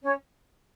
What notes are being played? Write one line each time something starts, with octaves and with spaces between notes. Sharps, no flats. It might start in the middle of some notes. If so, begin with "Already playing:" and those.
C#4 C#5